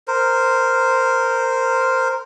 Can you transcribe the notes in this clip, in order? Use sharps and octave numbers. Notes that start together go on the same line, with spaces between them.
A#4 C5